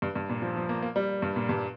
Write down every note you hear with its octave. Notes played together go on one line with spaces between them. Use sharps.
G2
G2
A#2
F3
F3
A#3
A#3
G3
G2
A#2
G2